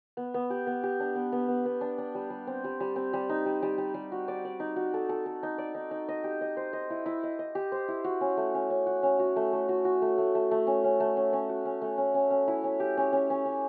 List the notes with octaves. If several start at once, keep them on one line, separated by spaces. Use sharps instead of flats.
B3
B3
G4
B3
G4
D4
B3
B3
B3
B3
D4
D4
G3
G3
C4
G3
G3
C4
G3
D#4
G3
G3
G3
G3
F#4
D5
D5
D#4
F#4
A4
A4
A4
D#4
D5
D#4
D#4
D#5
G4
D#5
C5
D#5
E4
E4
D#5
D#5
G4
C5
E4
F#4
C#4
A3
C#4
C#4
F#4
C#4
F#4
A3
A3
F#4
F#4
A3
A3
A3
A3
C#4
C#4
A3
C#4
C#4
F#4
C#4
A3
C#4
C#4
C#4
E4
C#4
G4
C#4
C#4
C#4
C#4